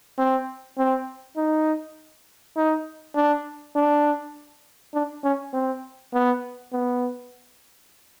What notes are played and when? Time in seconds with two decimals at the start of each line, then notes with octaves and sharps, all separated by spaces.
0.18 C4
0.78 C4
1.37 D#4
2.56 D#4
3.15 D4
3.75 D4
4.94 D4
5.24 C#4
5.53 C4
6.13 B3
6.73 B3